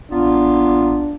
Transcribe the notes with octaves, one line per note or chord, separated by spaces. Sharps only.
A1 A#3 B3 D4 F4